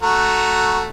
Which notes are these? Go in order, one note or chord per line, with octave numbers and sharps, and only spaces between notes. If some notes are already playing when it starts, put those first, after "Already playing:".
A3 F#4 A#5